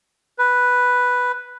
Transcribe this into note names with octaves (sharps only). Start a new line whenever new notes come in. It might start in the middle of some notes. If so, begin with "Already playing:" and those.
B4